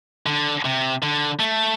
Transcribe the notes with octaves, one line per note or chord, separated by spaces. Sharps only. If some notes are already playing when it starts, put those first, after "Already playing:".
D3
C3
D3
A3